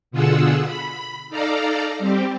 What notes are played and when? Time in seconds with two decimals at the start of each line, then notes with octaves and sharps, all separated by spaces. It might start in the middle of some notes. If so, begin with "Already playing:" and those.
0.11 B2 D3 F4 G#4 F#5 E6
0.64 B5
1.30 D#4 A4 D5 F5 A#5
1.99 G3 C4 G4